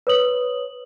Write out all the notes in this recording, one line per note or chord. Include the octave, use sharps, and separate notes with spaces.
B4 C#5 D#6 F#7